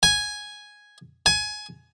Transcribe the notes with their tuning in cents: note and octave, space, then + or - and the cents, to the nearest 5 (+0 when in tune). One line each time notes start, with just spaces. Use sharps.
G#5 +0
G#5 +20